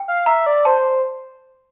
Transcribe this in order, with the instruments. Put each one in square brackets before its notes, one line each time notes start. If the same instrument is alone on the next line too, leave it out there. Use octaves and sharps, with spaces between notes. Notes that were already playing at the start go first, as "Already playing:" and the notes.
Already playing: [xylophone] G5
[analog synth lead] F5
[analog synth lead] E5 [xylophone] A#5
[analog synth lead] D5
[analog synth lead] C5 [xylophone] A5